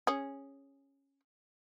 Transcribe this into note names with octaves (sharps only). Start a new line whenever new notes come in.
C#4 G#4